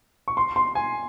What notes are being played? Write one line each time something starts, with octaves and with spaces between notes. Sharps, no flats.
C#6
C6
C6
G#5